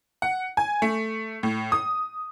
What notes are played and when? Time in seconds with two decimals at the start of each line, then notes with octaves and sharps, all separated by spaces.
0.22 F#5
0.57 G#5
0.82 A3
1.43 A2
1.72 D#6